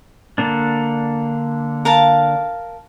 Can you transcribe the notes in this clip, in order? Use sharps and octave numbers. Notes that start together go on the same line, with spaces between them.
D3 A#3 D4
A#4 F5 A5